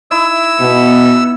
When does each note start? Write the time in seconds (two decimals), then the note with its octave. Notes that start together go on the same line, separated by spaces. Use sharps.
0.11 D#4 E4 E6
0.60 B2 B3